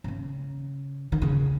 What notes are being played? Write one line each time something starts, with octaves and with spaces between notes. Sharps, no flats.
C3
C#3
D#3
C#3